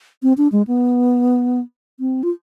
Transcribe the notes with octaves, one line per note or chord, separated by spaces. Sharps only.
C4
D4
G#3
B3
C4
F4